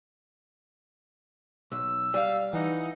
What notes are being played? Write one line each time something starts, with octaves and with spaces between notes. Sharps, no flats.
B1 E6
G3 F5
E3 D#4 F#5